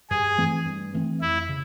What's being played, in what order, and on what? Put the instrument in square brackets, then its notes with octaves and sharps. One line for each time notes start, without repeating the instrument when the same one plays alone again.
[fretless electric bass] G2 [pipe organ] G#4
[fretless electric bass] E3 A3 C4
G2
E3 A3 C4
[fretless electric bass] F2 [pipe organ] E4
[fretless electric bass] C#3